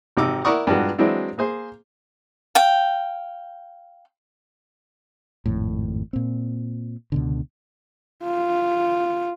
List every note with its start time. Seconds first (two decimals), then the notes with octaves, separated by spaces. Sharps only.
0.17 G#1 C3 D#4 D6 E6
0.45 E4 A#4 D5 F#5 C#6 D#6
0.67 G2 A#2 E3 F3 G#3 F#4
0.98 E3 F#3 G#3 C4 D4 E4
1.38 A#3 G#4 C5
2.55 F5 G5
5.46 G#1 F2 A2
6.13 A#2 C4
7.12 C#2 B2 D3
8.24 F4